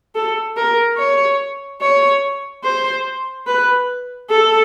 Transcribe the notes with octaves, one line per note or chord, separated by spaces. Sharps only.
A4
A#4
C#5
C#5
C5
B4
A4